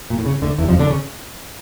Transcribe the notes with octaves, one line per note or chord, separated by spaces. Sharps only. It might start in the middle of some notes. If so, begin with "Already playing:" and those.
A#2
A2
C#3
D2 D3
E2 E3
G3
F2 F3
D3 D4
C#3 C#4